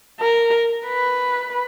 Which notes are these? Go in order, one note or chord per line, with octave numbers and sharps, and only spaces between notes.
A#4
B4